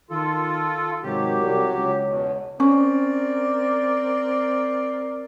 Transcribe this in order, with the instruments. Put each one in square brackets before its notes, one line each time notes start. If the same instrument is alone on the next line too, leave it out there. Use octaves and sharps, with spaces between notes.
[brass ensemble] D#3 [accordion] F4 A4
[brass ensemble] G#2 C3 D#3 [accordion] F#3 G4
[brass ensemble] C2
C#2 C#5
[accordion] E2 B2
[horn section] C4 A#4 D5 [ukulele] C#4